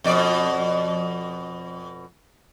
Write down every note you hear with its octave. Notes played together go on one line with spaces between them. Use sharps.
F2 B2 D5